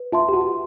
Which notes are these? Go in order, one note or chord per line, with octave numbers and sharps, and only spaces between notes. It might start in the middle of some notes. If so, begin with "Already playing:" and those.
Already playing: B4
F4 E5 A5 C6
G4
F#4